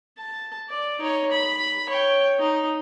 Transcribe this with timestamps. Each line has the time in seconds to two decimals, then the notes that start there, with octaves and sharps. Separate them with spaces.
0.18 A5
0.69 D5
0.99 D#4 C#5
1.31 B5
1.89 C#5 G5
2.39 D#4